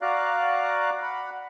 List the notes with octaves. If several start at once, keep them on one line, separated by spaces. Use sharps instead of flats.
F#4 D5 F5 A#5 D6 F#6
F#5 B5